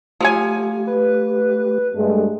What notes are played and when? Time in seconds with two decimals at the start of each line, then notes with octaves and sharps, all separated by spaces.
0.21 F3 F#3 A3 G4 G#5
0.87 B4
1.95 G2 G#3 A3